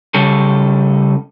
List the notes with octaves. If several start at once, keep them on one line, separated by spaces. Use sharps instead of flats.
C#3 G3 C#4 A4